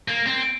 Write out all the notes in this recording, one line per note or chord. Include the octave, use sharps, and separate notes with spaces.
A#3
C4